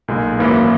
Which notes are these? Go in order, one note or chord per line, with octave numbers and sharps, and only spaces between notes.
B1 A#2 G#3
G#1 F#2 E3 A#3 E4